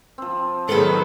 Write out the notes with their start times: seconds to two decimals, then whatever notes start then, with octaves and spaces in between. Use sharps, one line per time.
0.18 F3 C4
0.69 D#3 F#3 D#4 G#4 A4 B4